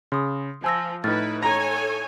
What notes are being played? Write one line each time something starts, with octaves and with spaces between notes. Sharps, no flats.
C#3 C6 D#6
F3 G#5 A5 E6 A#6
A2 D#4 E4 B4 F6 A6
A4 C#5 G#5 A#5